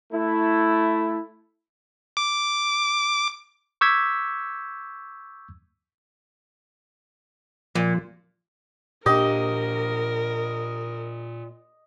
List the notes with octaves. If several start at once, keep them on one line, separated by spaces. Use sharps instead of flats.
A3 E4
D6
C#6 D6 E6 G6 G#6 B6
A#2 F3
A#2 D4 G4 A#4 D#5